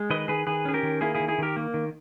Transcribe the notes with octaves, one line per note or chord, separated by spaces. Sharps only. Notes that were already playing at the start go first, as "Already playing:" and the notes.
Already playing: G#3
D#3 B4 D#5
D#3 G#4 B4
D#3 G#4 B4
C#4 G#4
G4 A#4
D#3
A#3 E4 G#4
E4 G#4
D#3
E4 G#4
D#3 G4 A#4
A#3
D#3